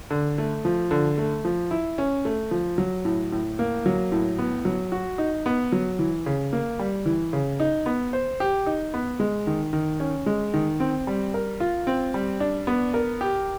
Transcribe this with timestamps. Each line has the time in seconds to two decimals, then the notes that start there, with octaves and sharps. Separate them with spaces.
0.10 D3
0.38 A3
0.65 F3
0.91 D3
1.18 A3
1.45 F3
1.71 E4
1.98 C#4
2.25 A3
2.51 F3
2.78 F#3
3.05 A2
3.32 A2
3.59 A#3
3.86 F#3
4.12 A2
4.39 B3
4.65 F#3
4.92 F#4
5.18 D#4
5.46 B3
5.72 F#3
5.99 E3
6.26 C#3
6.53 A#3
6.79 G3
7.06 E3
7.33 C#3
7.60 D#4
7.86 B3
8.13 C5
8.40 G4
8.66 D#4
8.94 B3
9.20 G#3
9.47 D#3
9.73 D#3
10.00 C#4
10.26 G#3
10.54 D#3
10.80 C4
11.07 G3
11.34 A#4
11.60 F4
11.87 C4
12.14 G3
12.40 D4
12.67 B3
12.94 A#4
13.21 G4